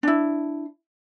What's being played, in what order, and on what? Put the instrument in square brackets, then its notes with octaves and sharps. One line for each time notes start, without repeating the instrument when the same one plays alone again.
[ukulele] D4 E4